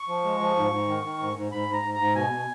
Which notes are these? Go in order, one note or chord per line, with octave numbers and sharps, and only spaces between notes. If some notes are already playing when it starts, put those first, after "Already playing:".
Already playing: C#6
F3
G#3
F3
G#2
G#2
D#3
D#3
G#2
G#2
G#2 B5
G#2
A#5
G#2
G#2 A#5
B2 G#5
B2